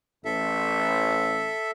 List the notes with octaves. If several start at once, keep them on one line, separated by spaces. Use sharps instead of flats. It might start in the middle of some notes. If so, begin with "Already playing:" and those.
A1 A4 E5